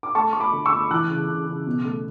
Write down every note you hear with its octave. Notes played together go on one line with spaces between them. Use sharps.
D6
A3 A5 C#6
A3 C#6
B5 D6
D3
C#6 E6
A3
E3 D6 F#6
C#3
C#3
C#3
B2
A3